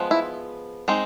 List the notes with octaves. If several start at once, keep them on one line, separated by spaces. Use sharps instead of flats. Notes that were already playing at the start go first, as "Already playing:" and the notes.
Already playing: F3 G#3 B3
E4
G#3 C4 D#4